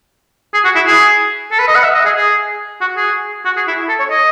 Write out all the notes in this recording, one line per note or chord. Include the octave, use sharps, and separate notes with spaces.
G#4
F#4
E4
G#4
A4
B4
D#5
F#5
E5
D#5
G#4
G#4
F#4
G#4
F#4
G#4
E4
A4
C#5
D#5